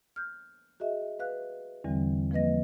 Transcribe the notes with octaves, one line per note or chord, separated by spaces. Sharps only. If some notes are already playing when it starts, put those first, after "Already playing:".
F6 G6
F#4 G#4 D#5 E5
B4 F5 F#6
E2 D3 E3 G3 C4
F3 A#3 B4 D#5 A#6